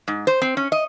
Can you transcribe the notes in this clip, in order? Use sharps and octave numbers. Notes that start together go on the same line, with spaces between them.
G#2
C5
C4
C#4
D#5